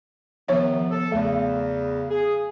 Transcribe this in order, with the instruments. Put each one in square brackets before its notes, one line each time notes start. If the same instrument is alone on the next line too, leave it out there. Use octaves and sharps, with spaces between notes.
[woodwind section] C3 D#3 B3 [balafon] F3 C#5 E5
[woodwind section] A4
[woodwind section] E2 C#3 [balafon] A3
[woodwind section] G#4